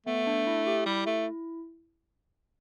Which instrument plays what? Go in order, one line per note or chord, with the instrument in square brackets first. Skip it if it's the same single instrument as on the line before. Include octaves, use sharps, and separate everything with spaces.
[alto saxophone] A3 [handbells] B3
[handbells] D4
E4
G4
[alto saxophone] G3 [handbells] E4
[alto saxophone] A3